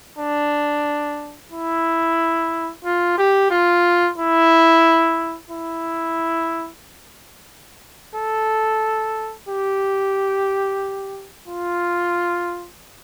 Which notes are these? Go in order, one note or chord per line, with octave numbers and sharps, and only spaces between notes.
D4
E4
F4
G4
F4
E4
E4
A4
G4
F4